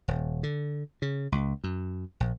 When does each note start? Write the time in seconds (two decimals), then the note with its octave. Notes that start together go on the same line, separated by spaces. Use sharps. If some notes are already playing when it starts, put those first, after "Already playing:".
0.08 D#1
0.43 D3
1.02 C#3
1.32 C#2
1.64 F#2
2.20 A#1